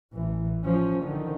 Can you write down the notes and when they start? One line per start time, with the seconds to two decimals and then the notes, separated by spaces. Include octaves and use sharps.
0.13 A1 E3
0.64 F3 C#4
1.03 D3 D#3